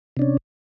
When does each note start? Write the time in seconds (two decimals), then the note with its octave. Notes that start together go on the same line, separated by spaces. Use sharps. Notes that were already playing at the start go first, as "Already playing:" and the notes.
0.17 C3
0.19 D4
0.22 C#4